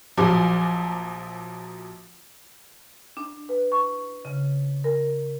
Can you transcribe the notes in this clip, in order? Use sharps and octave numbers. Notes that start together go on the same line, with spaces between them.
A#1 F3 F#3 D6
D4
B4
C#6
C#3
A#4